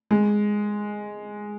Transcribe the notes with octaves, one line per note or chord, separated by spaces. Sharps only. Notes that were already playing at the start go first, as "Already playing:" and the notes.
G#3